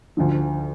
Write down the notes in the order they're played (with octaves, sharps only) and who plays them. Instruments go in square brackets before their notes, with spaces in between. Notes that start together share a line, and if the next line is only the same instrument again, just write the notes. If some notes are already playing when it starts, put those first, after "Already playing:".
[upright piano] D2 D3 F3